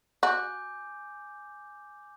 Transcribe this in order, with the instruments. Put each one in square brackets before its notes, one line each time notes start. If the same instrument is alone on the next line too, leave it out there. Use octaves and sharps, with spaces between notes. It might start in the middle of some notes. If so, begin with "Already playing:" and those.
[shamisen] F#4 [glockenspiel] G#5 D6 G6